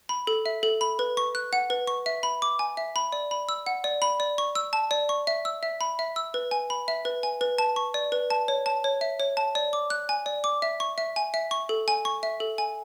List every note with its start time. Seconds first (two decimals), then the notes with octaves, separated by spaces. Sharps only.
0.09 B5
0.27 A4
0.46 E5
0.63 A4
0.81 B5
0.99 B4
1.17 C#6
1.35 F#6
1.53 F#5
1.70 B4
1.87 C#6
2.06 E5
2.23 B5
2.42 D6
2.59 G#5
2.77 E5
2.96 B5
3.12 D5
3.31 B5
3.49 E6
3.66 F#5
3.84 D5
4.02 B5
4.20 D5
4.38 C#6
4.55 E6
4.73 A5
4.91 D5
5.09 C#6
5.27 E5
5.45 E6
5.63 E5
5.81 B5
5.99 E5
6.16 E6
6.34 B4
6.51 G#5
6.70 B5
6.88 E5
7.05 B4
7.23 G#5
7.41 B4
7.58 A5
7.76 C#6
7.94 D5
8.12 B4
8.30 A5
8.48 C#5
8.66 A5
8.84 C#5
9.01 E5
9.20 C#5
9.37 A5
9.55 D5
9.73 D6
9.90 F#6
10.09 G#5
10.26 D5
10.44 D6
10.62 E5
10.80 C#6
10.98 E5
11.16 G#5
11.34 E5
11.51 C#6
11.69 A4
11.88 G#5
12.05 C#6
12.23 E5
12.40 A4
12.58 G#5